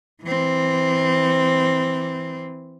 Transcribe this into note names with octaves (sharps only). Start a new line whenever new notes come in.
E3 C4